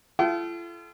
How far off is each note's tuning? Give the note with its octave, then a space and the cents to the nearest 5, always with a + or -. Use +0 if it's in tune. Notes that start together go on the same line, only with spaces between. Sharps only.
F4 -45 A4 -30 G5 -40